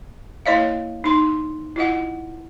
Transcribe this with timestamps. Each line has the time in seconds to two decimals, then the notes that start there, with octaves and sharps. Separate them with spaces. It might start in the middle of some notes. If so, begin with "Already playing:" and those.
0.46 A#3 E4 C#5 D#5 F5
1.04 D#4 C6
1.76 E4 F4 D#5 F#5